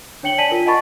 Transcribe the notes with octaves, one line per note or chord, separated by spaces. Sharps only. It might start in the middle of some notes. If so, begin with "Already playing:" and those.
D4 C#5 G5 C#7 F#7 G7
D5 G#5 A5 B6 D#7 F#7
F4 A#4
D#5 F#5 A5 B5 C#6 A6